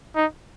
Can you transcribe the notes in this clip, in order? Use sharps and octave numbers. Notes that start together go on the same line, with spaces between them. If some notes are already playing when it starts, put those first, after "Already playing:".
D#4